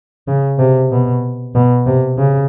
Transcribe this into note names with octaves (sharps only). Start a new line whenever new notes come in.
C#3
C3
B2
B2
C3
C#3